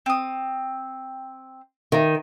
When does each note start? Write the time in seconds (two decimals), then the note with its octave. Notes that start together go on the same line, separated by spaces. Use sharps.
0.06 C4 D#6
1.92 D#3